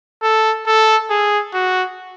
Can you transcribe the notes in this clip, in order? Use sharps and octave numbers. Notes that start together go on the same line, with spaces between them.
A4
A4
G#4
F#4